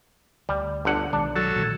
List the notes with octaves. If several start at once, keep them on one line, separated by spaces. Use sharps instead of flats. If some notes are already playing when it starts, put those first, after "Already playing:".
D2 G3
G1 D3 F#5
B1 D#3 G#3 D4
F#3 A4
A#2 D3 D#3